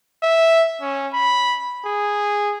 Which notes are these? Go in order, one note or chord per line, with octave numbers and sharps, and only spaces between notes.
E5
C#4
B5
G#4